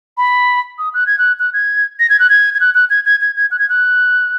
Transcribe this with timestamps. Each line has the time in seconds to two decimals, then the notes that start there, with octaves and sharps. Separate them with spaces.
0.17 B5
0.79 D#6
0.94 F#6
1.07 G#6
1.19 F#6
1.39 F#6
1.53 G#6
2.00 A#6
2.10 G#6
2.19 F#6
2.30 G#6
2.54 G#6
2.60 F#6
2.74 F#6
2.90 G#6
3.05 G#6
3.21 G#6
3.36 G#6
3.51 F#6
3.59 G#6
3.69 F#6